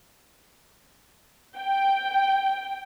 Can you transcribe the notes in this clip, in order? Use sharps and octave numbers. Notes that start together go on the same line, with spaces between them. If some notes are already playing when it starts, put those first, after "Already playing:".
G5